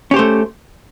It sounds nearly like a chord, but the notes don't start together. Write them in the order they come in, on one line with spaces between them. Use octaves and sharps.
C#4 G4 C5 A3